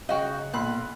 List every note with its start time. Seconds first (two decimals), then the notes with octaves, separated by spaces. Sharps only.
0.09 C#3 D#4 F#4 F5 G5
0.54 B1 A#2 B5 C6 F#6